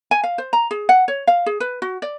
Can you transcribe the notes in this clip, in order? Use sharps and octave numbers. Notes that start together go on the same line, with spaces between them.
G#5
F5
C5
A#5
G#4
F#5
C#5
F5
G#4
B4
F#4
D5